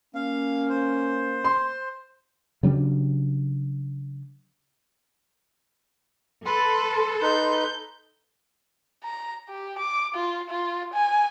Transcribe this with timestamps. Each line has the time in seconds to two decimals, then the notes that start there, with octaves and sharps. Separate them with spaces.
0.15 A#3 C#4 F5
0.69 C5
1.44 C6
2.63 C#3 F#3 G3 D4
6.45 A4 B4 C6
7.22 D#4 B4 G6
9.04 A#5
9.49 G4
9.79 D6
10.15 F4
10.50 F4
10.93 G#5